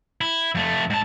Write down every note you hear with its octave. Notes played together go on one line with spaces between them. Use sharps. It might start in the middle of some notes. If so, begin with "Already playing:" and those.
E4
F2 A3
G#2 A5